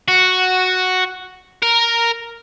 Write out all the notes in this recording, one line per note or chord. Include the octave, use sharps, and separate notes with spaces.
F#4
A#4